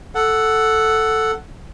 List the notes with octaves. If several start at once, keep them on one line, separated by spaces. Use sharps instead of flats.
A4 F#5